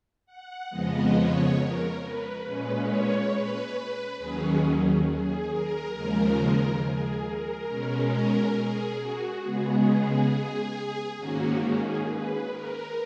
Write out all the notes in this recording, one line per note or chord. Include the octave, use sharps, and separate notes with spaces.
F#5
F2 C#3 F3 G#3 B3 D#5
C#5
A#4
B4
A#2 G#3 C#4 B4
C#5
B4
B4
D#2 D#3 F#3 C#4 G#4
G#4
A#4
D#2 C#3 F3 G#3 A#4
G#4
A#4
B2 G#3 C#4
A#4
G#4
F#4
C#3 G#3 B3 G#4
G#4
G#2 D#3 A#3 C#4 F#4
G#4
B4
A#4